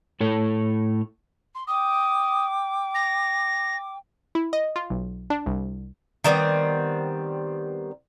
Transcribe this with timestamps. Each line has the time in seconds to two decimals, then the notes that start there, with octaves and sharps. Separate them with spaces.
0.21 A2 A4 C#5
1.55 C6
1.67 G5 D6 D#6
2.94 A#6
4.35 E4
4.53 D#5
4.76 F4
4.90 B1
5.30 D4
5.46 C2
6.24 D#3 G3 B3 C4